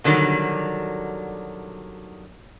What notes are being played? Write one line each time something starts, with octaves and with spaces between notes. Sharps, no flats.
B2 D3 D#3 F#3 G3